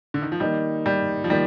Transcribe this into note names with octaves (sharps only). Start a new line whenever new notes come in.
D3
D#3
F3
D#3 G3 A#3 D#4
G3
F3
D#3 G3 A#3